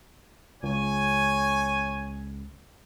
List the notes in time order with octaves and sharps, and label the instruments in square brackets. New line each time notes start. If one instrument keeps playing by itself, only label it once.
[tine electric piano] C#2 [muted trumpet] C#5 [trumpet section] G#5